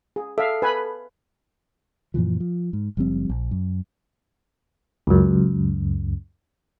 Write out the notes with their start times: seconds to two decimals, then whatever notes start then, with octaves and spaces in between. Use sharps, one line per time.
0.16 G#4
0.38 A4 E5 F5
0.62 B4 G#5 B5
2.14 F#2 A#2 E3 F3
2.40 F3
2.73 G#2
2.97 F#1 F3 G3 C4
3.29 A#1
3.51 F#2
5.07 C#2 F#2